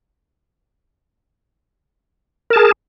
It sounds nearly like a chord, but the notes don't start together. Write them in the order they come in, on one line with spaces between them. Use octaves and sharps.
A#4 A5 G#4